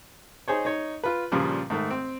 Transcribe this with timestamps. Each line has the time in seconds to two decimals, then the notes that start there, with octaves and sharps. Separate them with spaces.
0.48 D#4 G#4 C5 C#5
0.65 D#4 C#5
1.04 F4 B4
1.32 G2 A#2 C#3 F3 G3
1.70 G#2 D#3 A3
1.90 C4